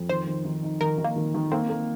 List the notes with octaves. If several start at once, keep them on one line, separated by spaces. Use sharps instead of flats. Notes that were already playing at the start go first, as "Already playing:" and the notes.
Already playing: F2
D#3 C5
D#3
D#3
D#4
D#3 A#4
D#3
A#3
D#3
D#3
A#3 C4
A#3